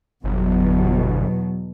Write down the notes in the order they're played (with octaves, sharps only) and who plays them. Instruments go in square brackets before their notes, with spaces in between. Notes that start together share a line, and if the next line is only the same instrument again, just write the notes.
[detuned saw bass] G1 [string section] E2 B2 F#3